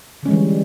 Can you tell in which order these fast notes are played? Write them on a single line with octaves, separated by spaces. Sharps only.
D3 C#4 G#3 E3 G3